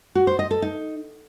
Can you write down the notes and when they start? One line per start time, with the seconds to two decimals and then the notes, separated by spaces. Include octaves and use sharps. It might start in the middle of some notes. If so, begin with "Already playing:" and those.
0.15 F#4
0.27 C5
0.39 D#5
0.51 A4
0.62 D#4